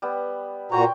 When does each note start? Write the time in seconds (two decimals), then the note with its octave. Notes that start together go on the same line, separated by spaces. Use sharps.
0.02 G3 B3
0.72 A#2 F#4 C#5 G5 A#5 C6